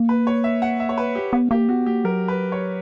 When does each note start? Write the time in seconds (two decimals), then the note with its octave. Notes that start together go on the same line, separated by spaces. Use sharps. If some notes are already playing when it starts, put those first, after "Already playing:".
Already playing: A#3
0.09 B4
0.27 C#5
0.44 E5
0.62 F#5
0.80 E5
0.89 C#5
0.98 B4
1.15 G4
1.33 B3
1.51 A#3 G4
1.68 B3 F#4
1.86 A#3 G4
2.04 F#3 A#4
2.28 B4
2.52 C#5